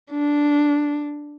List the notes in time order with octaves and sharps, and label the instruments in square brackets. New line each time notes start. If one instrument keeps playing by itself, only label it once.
[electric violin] D4